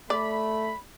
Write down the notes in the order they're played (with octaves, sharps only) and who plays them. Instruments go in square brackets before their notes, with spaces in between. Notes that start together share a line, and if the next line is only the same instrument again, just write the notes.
[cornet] A3 [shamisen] D5 [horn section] B5